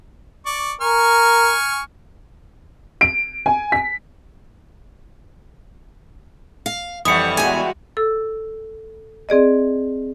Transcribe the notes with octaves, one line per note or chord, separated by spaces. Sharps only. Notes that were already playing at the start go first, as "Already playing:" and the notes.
D5 C#6
A#4 G#5 C#6 F6
D7
G#5
B6
F5
F2 E3 G3 F#5 C#6 D#6 C#7
E2 G#3 F#4 G#5
A4 E6
C4 G#4 D5 D#5